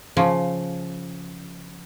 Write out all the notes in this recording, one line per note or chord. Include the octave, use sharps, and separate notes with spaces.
C#3 F3 C#4